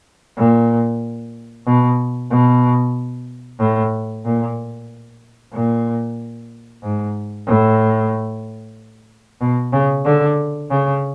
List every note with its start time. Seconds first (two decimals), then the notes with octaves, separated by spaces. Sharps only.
0.36 A#2
1.66 B2
2.30 B2
3.59 A2
4.24 A#2
5.52 A#2
6.83 G#2
7.47 A2
9.41 B2
9.73 C#3
10.05 D3
10.70 C#3